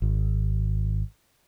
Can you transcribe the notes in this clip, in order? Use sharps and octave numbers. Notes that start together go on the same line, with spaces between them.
G#1